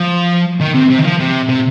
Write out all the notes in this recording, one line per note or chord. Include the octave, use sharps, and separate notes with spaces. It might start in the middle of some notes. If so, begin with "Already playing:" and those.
Already playing: F3
D#3
C3
C3
D#3
F3
C3
C3